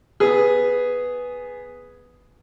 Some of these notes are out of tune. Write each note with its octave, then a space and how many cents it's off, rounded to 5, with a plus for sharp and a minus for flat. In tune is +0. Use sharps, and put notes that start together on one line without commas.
B3 +0 G#4 +0